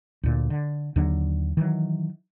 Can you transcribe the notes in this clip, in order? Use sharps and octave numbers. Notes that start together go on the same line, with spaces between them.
D2 A#2
D3
D#2 D3 F#3 D4
D#3 E3 F#3